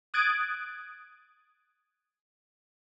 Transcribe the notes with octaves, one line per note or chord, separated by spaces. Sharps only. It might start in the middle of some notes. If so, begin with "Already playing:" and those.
D#6 F#6 G#6 A6 D7